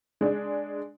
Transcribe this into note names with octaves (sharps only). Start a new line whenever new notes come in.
G#3 D4